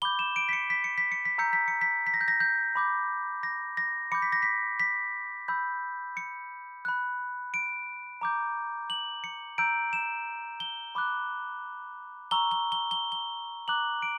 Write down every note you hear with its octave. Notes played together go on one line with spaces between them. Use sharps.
B5 D6 G6 G7
E7
D7
B6
C#7
B6
C#7
B6
C#7
B6
A#5 E6 G6 C#7
B6
C#7
B6
B6
A#6
G6
A#6
G6
B5 D6 G6
A#6
A#6
B5 D6 G6 C#7
B6
A#6
B6
B6
B5 E6 G6
C#7
B5 F#6
D7
A#5 D6 G6
F#7
C#7
A#5 E6 G6 D7
E7
G7
B5 D6 F#6
A#5 C#6 E6 G7
G7
G7
G7
G7
A#5 D6 F#6 F#7
D7